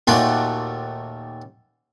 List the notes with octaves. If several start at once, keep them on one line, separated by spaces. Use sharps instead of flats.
D#2 A#2 A3 F#4 D5 C6